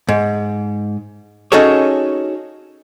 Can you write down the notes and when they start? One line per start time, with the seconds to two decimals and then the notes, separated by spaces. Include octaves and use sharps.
0.08 G#2
1.52 C#4 D#4 F#4 G#4 A4 C#5